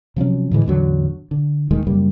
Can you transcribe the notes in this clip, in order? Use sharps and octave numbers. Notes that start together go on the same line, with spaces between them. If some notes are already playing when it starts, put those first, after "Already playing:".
C3 F3 F#3 C#4
A2 D3 E3 G#3
A1 E2 D3 F#3
D3
D#1 D#2 D#3 G#3
F#2 C#3 G3 A#3